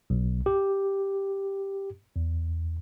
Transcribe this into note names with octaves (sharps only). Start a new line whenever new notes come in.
B1
G4
E2